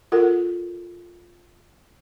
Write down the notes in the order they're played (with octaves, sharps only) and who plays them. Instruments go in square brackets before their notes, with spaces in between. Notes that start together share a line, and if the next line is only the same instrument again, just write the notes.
[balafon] F4 A4 A#4 F#5